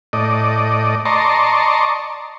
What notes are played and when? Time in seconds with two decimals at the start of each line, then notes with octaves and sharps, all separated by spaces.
0.13 A2 D5 D#5
1.05 D5 D#5 A5 A#5 C6 C#6